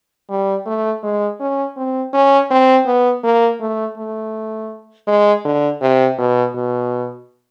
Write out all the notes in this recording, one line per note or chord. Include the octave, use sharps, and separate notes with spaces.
G3
A3
G#3
C#4
C4
C#4
C4
B3
A#3
A3
A3
G#3
D3
C3
B2
B2